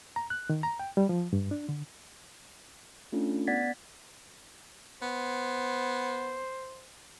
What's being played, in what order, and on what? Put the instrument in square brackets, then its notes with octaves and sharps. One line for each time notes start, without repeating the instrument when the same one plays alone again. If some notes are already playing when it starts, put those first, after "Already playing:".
[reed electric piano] A#5
F#6
D#3
A#5
G5
G3
F3
G2
D4
D3
[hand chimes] A3 C#4 D4 F4 A4
B3 D5 F#5 G#6 A6 B6
[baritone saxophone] B3 [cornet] C5